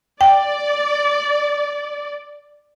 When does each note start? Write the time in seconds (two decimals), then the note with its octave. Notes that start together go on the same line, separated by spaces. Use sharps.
0.21 D5 G5